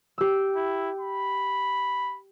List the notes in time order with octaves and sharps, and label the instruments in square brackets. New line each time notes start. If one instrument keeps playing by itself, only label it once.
[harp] G4 E6
[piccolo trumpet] E4
B5